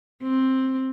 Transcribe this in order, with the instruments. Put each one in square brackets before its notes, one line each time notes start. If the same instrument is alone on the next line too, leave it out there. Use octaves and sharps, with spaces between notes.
[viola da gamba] C4